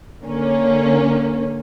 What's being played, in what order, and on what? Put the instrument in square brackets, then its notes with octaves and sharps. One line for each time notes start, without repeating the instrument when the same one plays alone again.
[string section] D3 A#3 C#4